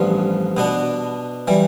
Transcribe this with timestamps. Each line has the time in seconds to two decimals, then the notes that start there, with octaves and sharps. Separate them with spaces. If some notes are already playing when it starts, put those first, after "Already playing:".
Already playing: A1 G2 F3 B3
0.57 B2 B3 D4
1.48 E3 G3